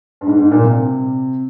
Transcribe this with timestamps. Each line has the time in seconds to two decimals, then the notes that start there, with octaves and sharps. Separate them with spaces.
0.21 G2
0.27 G#2
0.39 G#2
0.51 A#2
0.64 C3